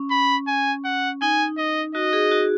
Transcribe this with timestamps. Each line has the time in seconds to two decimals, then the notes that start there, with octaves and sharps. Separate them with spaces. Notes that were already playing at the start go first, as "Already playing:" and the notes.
Already playing: C#4
0.11 B5
0.48 G#5
0.85 F#5
1.22 D#4 G#5
1.58 D#5
1.95 F#4 D#5
2.13 G#4
2.31 F#4